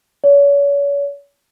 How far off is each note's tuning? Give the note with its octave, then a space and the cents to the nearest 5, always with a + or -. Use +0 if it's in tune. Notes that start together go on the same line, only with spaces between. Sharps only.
C#5 +35